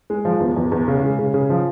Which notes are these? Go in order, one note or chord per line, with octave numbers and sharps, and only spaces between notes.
G#3
F3
E2
E2
E2
C#3
G#3
C#3
C#3
F3